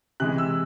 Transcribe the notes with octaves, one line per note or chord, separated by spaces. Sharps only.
C3 E3 G#3 F#6
E6